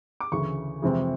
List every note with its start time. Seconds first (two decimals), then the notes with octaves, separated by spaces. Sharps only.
0.20 D6
0.32 D2 C#3 E3 C#6
0.82 F2 C3 E3 G#3 C4